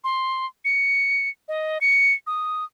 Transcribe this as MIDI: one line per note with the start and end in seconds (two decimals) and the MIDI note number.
0.04 0.46 84
0.65 1.29 97
1.48 1.78 75
1.81 2.13 97
2.27 2.64 87